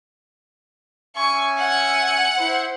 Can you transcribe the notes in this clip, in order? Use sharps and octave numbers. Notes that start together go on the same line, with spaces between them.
C#4 E5 G#5 C#6
F#5
E4 C5